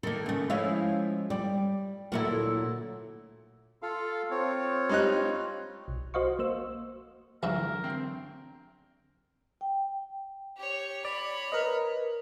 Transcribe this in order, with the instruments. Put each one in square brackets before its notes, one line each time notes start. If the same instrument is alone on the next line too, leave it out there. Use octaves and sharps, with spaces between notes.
[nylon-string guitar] D#3 [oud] A#3 A4
[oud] C#3 A3
[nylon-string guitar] F3 G#3 C#4 [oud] E4 F5
[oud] G3 [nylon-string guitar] D5
[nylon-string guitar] D2 A#2 F#3 [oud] E4 A4 A#4
[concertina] F4 A4 F5
C4 F4 C#5
[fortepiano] G3 D#4 F#6
[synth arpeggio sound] B1
F#4 C5 D#5 F5 C#6
A#3 C5 E6
[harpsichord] C#2 G#2 E3 [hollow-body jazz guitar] D3 F#3 [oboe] A#4
[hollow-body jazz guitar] C4 D4 G5
[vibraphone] G5
[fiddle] G4 C#5
[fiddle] C#5 B5 [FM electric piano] D5
[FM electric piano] A#4 B4 D#5